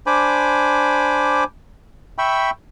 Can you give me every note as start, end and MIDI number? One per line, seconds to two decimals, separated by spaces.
0.07 1.44 62
0.07 1.44 72
0.07 1.44 80
0.07 1.44 83
0.07 1.44 86
2.18 2.50 76
2.18 2.50 79
2.18 2.50 83
2.18 2.50 85
2.18 2.50 88